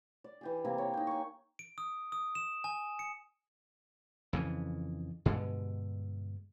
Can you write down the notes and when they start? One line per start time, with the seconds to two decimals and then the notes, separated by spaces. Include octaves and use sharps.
0.24 D5
0.41 E3 G4 G#4
0.65 C3 A#3 E4
0.78 C#5
0.94 D#4 G5
1.07 G#5 C#6
1.59 D7
1.78 D#6
2.12 D#6
2.35 E7
2.64 G#5
2.99 C#7
4.33 F2 C#3 E3
5.26 G2 B2 D3 G#3